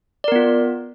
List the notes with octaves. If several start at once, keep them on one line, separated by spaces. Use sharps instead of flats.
B3 F4 A#4 D5